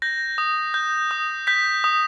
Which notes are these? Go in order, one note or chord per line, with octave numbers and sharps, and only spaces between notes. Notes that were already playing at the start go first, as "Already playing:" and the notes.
G6 A#6
D#6
G6
D#6
G6 B6
D#6